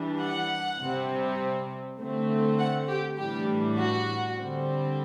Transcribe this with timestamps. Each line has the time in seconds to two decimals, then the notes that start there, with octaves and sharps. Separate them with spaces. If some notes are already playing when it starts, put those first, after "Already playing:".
Already playing: E3 G3 D4
0.21 F#5
0.81 C3 G3 C4
2.00 D3 A3 C4
2.59 F#5
2.88 G4
3.18 A2 E3 G3 D4 G4
3.77 F#4
4.37 D3 G3 C4